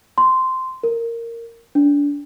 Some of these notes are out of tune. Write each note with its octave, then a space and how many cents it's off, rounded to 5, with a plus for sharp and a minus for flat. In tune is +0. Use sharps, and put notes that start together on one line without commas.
C6 -10
A#4 -10
D4 -30